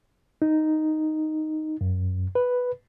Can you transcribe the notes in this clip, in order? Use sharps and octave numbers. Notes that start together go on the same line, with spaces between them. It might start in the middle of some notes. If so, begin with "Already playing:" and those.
D#4
F#2
B4